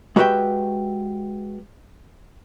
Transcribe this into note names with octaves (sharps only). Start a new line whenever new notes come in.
G#3 F#4 G4 B4 E5 G5